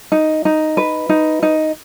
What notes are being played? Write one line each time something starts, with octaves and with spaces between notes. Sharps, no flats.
D#4
D#4
B4
D#4
D#4